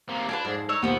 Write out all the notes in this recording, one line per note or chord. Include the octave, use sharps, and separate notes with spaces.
C3 A#3
D4 F4 G4 B4 G#6
F2 G#2 G#3
D4 D#4 C#5 E6
D#2 B2 D#3 F3 B3